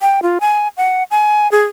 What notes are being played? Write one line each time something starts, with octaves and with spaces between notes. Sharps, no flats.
G5
F4
G#5
F#5
G#5
G#4